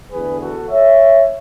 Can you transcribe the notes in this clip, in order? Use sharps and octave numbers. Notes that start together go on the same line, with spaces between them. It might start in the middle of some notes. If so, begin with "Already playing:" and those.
E2 D3 A3 G#4 B4
F#4 A4
C#5 E5